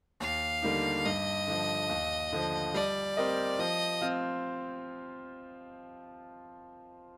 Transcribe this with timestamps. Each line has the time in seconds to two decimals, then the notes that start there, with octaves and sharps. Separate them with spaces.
0.20 D#2 F5
0.62 D3 G3 A#3 D#4
1.05 G2 D#5
1.48 D3 F3
1.89 D#2
2.33 D3 F3
2.74 G3 D5
3.17 C4 G4 A#4 D#5
3.59 F3 D#5
4.01 C4 F4